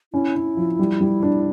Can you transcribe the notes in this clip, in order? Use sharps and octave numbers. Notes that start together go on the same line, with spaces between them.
C#4 E4
C#4
F3
G3
G3
D4